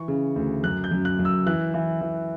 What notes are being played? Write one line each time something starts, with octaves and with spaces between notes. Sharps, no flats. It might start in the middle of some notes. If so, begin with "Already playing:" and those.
Already playing: E3 C#6
C#3
D2
F#2 F#6
G6
F#2
F#6
F#2
E6
E3 F#6
E3
E3